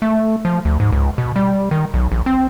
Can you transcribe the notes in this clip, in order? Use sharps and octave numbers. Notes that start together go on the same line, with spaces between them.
A3
F3
D2
G#2
C#2
B2
G3
D#3
B1
A#1
C4